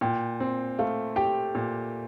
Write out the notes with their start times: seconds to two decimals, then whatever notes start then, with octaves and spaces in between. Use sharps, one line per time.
0.01 A#2 G5
0.40 C4
0.79 A3 F5
1.16 G4 G5
1.55 A#2